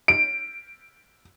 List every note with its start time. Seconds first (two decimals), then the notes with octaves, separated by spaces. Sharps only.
0.08 D7